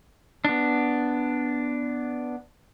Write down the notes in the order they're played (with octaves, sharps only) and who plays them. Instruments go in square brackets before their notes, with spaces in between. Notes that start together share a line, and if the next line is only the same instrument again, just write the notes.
[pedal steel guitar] B3 D4